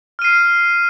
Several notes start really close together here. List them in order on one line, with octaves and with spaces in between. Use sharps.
F6 D#7 C7